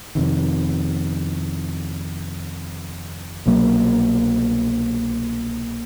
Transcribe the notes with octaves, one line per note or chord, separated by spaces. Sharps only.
F2 C3 D#3
C2 B2 F#3 A#3